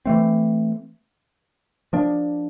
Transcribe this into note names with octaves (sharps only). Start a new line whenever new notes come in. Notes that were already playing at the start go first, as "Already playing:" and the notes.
E3 A3 C4
F3 A#3 D4